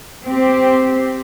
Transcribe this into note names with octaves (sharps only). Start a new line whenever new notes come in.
C4 G4